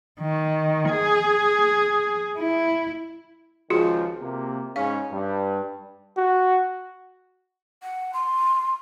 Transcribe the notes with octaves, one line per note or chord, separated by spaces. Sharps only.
D#3
G#4
E4
C#2 D#3 F3 F4 F#4 G#4
C3 A#3
G#2 C#3 C#4 F5
G2
F#4
F#5
C6